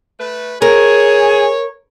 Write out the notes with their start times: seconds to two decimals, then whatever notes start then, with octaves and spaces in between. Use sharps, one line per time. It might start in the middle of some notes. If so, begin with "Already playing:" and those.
0.19 A3 B4
0.62 G#4 A#4 C#5